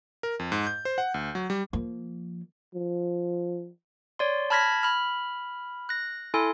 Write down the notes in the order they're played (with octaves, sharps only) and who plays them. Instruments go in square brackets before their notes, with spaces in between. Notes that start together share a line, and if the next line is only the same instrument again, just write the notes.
[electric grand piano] A#4
F2
G#2
G6
C5
F#5
D2
F#3
G3
[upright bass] F3 A#3
[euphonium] F3
[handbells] C#5 D5 C6
A5 B5 F6 G#6 A#6 B6
B5 F6
F#6 A#6
E4 A4 G#5 C6